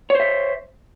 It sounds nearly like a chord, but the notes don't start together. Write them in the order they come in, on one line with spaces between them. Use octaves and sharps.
C#5 C5 E5